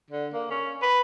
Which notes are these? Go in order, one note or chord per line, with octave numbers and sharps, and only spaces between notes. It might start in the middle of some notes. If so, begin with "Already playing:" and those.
D3
A#3
C#4
B4